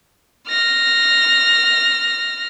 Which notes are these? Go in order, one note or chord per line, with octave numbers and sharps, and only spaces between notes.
F6 A#6